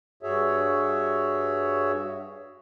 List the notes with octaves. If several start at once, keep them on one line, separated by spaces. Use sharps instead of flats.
G2 F#4 G#4 C#5 E5